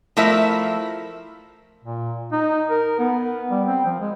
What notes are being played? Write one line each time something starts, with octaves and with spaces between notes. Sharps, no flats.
F3 A3 E4 A#4 E5
A#2
D#4
A#4
B3
G3
C4
F3
G#3